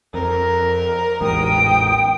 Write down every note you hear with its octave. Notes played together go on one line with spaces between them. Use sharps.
F2 A#4
A1 E2 G#2 G5 D#6